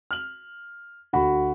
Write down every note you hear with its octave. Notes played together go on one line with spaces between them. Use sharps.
F6 F#7
D2 F#4 B5